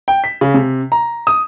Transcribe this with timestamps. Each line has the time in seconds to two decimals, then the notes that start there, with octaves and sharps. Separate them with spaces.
0.08 G5
0.24 B6
0.41 C#3
0.54 C3
0.92 A#5
1.27 D#6